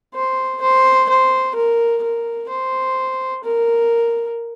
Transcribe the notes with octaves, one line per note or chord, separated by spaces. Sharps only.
C5
C5
C5
A#4
A#4
C5
A#4